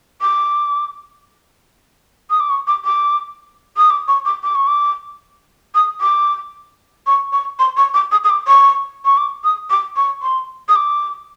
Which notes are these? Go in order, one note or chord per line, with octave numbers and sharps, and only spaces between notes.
D6
D#6
D6
C#6
D6
D6
D#6
D6
C#6
D6
D6
C#6
D6
D#6
D6
C#6
C#6
C6
C#6
D6
D#6
D#6
D6
C#6
C#6
D6
D#6
D6
C#6
C6
D#6
D6